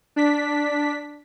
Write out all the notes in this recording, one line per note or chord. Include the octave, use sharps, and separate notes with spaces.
D4 B6